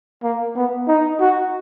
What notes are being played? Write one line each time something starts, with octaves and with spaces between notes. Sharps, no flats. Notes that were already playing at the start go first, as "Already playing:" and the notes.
A#3
B3
D#4
F#4